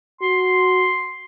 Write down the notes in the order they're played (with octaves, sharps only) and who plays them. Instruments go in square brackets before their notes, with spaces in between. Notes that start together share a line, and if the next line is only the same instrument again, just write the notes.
[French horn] F#4 [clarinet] C6